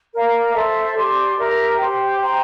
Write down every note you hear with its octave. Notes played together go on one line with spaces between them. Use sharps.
A#4 D5 F5 A#5
A4 C5 E5
G4 D5 A5 C6
G4 A#4 E5 A#5
G4 C5 G5
C5 G5 A#5